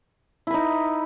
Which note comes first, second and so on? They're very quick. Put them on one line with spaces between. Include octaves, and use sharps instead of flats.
E4 B4 D#4